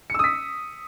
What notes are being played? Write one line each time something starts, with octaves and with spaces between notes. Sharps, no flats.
D#6 E6 B6 C#7